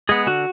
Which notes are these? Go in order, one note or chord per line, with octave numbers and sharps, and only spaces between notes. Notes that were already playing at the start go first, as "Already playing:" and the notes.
G#3 B3 G#4
D3 F#4